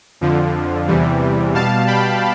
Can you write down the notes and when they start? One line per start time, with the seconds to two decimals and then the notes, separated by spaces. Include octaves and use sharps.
0.21 F2 D3 F3
0.87 E2 C3 E3 G3
1.54 B2 G3 F5 A5
1.87 G5 B5